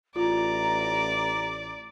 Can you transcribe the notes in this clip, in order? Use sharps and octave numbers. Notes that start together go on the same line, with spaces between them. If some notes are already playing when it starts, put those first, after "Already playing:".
A1 F4 D5 A#5